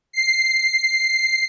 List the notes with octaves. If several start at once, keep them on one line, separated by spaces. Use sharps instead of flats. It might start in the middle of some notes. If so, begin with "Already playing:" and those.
C7